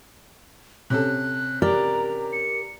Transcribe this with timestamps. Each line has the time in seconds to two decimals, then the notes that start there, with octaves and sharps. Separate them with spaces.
0.90 C3 C#4 A4 F#6
1.62 G4 A#4 D5 A#5
2.33 C#7